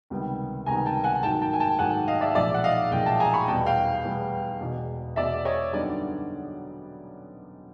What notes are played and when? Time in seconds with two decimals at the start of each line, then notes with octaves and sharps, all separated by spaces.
0.10 C#2 C3 D#3 G3 B3
0.66 C#2 C3 D#3 G3 B3 G#5 A#5
0.86 G5 A5
1.04 F#5 G#5
1.23 A1 G#2 D#3 F#3 A#3 G5 A5
1.41 G5 A5
1.53 G#5
1.60 G5 A5
1.79 A1 G#2 D#3 F#3 A#3 F#5 G#5
2.08 D#5 F5
2.21 D5 E5
2.35 B1 A#2 F3 G#3 D5 E5
2.54 F#5
2.64 D#5 F5
2.91 B1 A#2 F3 G#3 F5 G5
3.06 G5 A5
3.20 G#5 A#5
3.33 B5 C#6
3.48 E2 B2 G3 B3 G5 A5
3.66 F5 G5
4.04 E2 B2 G3 B3
4.61 E1 E2 B2
5.16 E1 E2 B2 D5 E5
5.45 C#5 D#5
5.73 F#2 D3 G3 B3 D#4 D5